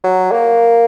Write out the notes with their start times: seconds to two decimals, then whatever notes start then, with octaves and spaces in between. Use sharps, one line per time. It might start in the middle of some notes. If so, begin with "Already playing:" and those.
0.04 F#3
0.32 A#3